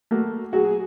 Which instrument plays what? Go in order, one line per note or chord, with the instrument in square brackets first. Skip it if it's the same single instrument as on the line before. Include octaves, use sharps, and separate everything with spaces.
[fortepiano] A3 A#3 F#4
[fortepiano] F#3 F#4 [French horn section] G#4